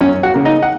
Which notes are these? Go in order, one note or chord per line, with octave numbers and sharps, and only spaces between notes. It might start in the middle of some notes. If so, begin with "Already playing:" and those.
F#2 C#4 C#5
F#4 F#5
C#3 A#3
D#4 D#5
F#5